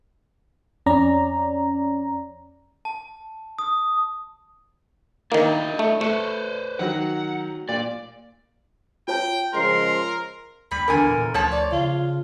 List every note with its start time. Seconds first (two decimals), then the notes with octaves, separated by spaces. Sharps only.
0.86 F2 C#4 D5 A#5
2.85 A5
3.59 D#6
5.32 D#3 A#3 E4 D5 D#5
5.79 A3
6.01 A3 B4 C5 C#7
6.79 D#3 F#3 F#4 F#5
7.69 A#2 D5
9.08 F4 C#5 G5 A5
9.54 C#3 F3 G#3 A#4 C6
10.71 D#2 G3 B5
10.88 E2 D3 A#4 G#5
11.09 A#2
11.34 D2 F3 C#5 A5
11.52 D5
11.72 C#3 F4